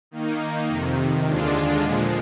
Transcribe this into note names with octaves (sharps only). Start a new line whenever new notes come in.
D#3 A#3 D#4
F2 C3 D#3
D#2 D3 G#3 D4 F4
A#2 F3 G#3